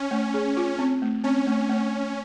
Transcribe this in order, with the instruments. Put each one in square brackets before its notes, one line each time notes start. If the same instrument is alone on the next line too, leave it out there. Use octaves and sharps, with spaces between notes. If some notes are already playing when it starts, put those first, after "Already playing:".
Already playing: [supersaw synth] C#4
[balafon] A3
G#4
F4
C4
A3
[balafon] C4 [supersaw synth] C#4
[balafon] A3
A3